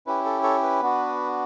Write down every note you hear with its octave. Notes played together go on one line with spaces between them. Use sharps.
C#4 E4 G4 B4
A4
A4 C#5
B4
B3 D4 F#4